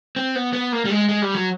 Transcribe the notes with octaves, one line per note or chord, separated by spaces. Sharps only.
C4
B3
B3
A#3
G3
G#3
G#3
G3
F#3